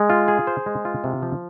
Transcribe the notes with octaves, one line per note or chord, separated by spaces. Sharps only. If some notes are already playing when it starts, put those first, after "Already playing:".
Already playing: G#3
F4
G#4
C5
G#3
F4
C3
F3